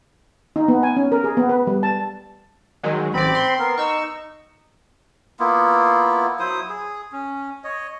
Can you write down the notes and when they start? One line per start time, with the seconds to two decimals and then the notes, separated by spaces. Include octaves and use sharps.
0.56 D#4
0.68 B3
0.83 G#5
0.97 C#4
1.12 A#4
1.24 G#4
1.37 B3
1.49 B4
1.67 G3
1.83 A5
2.83 D#3 F#3 G#3
3.14 A1 C4 D5 B5
3.35 C6
3.59 B3 A#4
3.78 D#4 C#6 E6
5.40 A#3 B3 E4 F4
6.39 F#3 E4 C5 D#6
6.69 G#4
7.12 C#4
7.64 C#5 D#5